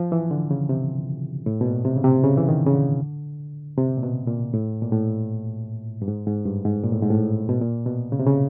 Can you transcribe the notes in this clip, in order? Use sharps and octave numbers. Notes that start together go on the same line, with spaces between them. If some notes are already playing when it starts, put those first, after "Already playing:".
Already playing: F3
E3
D3
C#3
C3
A2
B2
A#2
C3
C#3
C3
C#3
E3
D#3
C#3
D3
C3
A#2
B2
A#2
A2
A#2
A2
G2
G#2
G#2
G2
G#2
A#2
A2
G#2
A2
B2
A#2
B2
C#3
C3
C#3